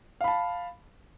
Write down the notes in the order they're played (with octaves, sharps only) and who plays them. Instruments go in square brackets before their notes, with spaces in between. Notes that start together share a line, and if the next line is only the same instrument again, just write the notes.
[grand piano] F5
B5
A5